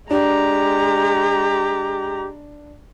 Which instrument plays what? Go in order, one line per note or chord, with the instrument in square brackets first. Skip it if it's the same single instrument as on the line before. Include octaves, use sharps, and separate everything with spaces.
[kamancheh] G#3 A#5 [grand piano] D4 [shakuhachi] G4